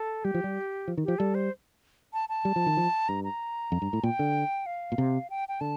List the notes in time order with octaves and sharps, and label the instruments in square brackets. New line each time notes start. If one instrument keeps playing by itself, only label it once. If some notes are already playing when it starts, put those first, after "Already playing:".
Already playing: [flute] A4
[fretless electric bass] G3 [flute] G4
[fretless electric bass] F3
G3
F3
D#3
[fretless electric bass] F3 [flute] G4
[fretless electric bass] G3 [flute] A4
[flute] C5
A5
A5
[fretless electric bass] G3
F3
D#3
F3
[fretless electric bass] G2 [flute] A#5
[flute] A#5
[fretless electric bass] F2
G2
A2
[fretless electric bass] A#2 [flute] G5
[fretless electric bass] D3
[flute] F5
[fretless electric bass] A#2
C3
[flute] G5
G5
[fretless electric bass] D3 [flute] A5